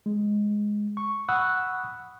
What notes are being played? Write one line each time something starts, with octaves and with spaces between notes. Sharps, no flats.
G#3
C#6
F#5 B5 C#6 D#6 E6 F#6